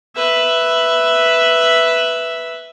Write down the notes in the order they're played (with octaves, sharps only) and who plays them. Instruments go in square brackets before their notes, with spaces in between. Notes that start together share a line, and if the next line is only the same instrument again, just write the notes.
[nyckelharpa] B4 E5